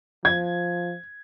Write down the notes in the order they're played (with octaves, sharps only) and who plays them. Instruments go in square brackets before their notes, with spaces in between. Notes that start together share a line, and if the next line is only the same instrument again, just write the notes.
[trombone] F3 [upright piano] G#6